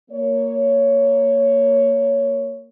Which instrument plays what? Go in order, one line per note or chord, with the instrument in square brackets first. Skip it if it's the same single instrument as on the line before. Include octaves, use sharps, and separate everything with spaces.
[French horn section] A#3 C#5